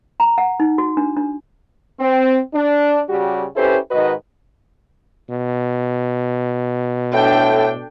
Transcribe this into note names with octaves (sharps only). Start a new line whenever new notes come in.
A#5
F#5
D#4
F#4
D4
D4
C4
D4
C#3 G3 F#4 G4
C#4 E4 G4 A4 B4 C5
G#2 D#3 F#4 B4 D#5
B2
A2 D4 A4 G5